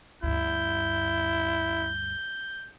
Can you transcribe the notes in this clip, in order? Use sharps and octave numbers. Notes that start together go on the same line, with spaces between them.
D2 G2 E4 G6